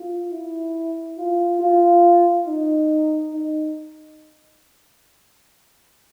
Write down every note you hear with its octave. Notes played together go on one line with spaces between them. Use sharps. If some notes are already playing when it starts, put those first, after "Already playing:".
Already playing: F4
E4
F4
F4
D#4
D#4